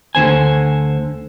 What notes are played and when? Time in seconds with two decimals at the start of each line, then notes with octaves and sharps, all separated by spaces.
0.15 D2 D3 C5 G#5